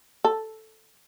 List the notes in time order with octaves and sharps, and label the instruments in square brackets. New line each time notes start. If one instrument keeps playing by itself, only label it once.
[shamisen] A4